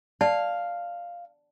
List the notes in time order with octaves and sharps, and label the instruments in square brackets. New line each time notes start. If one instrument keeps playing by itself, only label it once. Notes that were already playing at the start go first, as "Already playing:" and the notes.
[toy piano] D5 A5 [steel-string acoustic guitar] F5